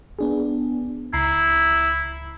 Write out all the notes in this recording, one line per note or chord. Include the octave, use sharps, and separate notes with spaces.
B3 D4 G#4
C#2 E4 A#5 C7